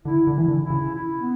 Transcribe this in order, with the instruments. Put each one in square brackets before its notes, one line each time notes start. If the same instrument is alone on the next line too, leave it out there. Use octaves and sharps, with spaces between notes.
[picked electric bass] D3 [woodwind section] E4
[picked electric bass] D3
[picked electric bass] E3 [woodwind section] E4
[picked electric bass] D3
[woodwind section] E4
[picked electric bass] C#3
[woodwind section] E4
B3